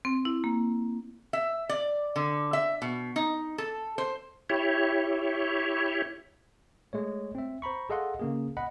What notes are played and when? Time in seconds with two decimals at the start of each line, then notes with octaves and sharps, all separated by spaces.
0.05 C4
0.25 E4
0.44 A#3
1.33 E5
1.69 D5
2.16 D3
2.53 E5
2.82 B2
3.16 D#4
3.58 A4
3.98 C5
4.50 E4 G4 C#5
6.93 G#3 A3 C#5
7.35 C4 E5
7.62 C5 A#5 B5 C#6
7.90 G#4 A4 D#5 F5 F#5 C6
8.19 C#3 A#3 G#4
8.57 D#5 F#5 B5